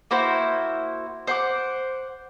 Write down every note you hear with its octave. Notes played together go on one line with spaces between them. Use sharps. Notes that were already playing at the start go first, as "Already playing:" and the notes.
A#3 E4 F#4 C5
C5 F#5 D6